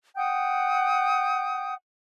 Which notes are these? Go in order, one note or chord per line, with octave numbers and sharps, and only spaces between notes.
F#5 G5 D#6 G6